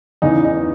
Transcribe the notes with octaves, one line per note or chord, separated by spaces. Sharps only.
E2 C#3 E3 D#4
D#4